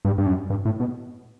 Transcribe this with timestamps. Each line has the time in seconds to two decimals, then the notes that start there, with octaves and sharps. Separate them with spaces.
0.05 G2
0.18 G2
0.26 F#2
0.50 G2
0.65 A2
0.80 B2